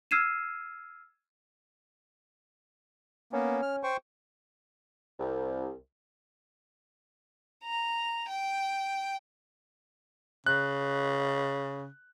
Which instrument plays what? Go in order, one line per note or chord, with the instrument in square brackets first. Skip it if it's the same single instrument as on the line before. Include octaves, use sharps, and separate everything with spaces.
[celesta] E6 F6 G#6 C7 D#7 E7
[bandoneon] A#3 B3 [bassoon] C#4
[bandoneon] F6
C5 G5 C#6
[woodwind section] C2
[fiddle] A#5
G5
[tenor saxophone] C#3 [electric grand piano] F#6